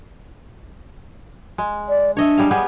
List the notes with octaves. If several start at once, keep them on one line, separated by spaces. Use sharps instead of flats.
G#3
D5
D4 C#5 D#5 E5
G3 G#4 F5
B3 G4 G#4